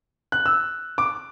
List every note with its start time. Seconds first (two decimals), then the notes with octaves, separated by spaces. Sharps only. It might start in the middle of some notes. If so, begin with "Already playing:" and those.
0.32 F#6
0.46 E6
0.98 D6